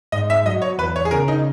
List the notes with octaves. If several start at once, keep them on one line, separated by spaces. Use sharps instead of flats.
G#2 D#5
E5
F#3 D#5
C#5
E2 B4
C#5
G#4
C#3 A#4
D#4